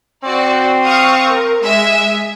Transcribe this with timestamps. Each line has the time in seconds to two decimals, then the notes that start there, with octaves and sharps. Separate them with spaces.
0.24 C4 F#4 D5
0.85 F5 C#6 D#6
1.28 A#4
1.63 G#3 E5 G#5